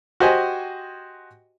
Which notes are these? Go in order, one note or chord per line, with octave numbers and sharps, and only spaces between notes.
F#4 G4 C5 D#5 G#5